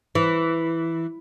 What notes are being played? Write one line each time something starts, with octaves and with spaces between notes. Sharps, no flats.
E3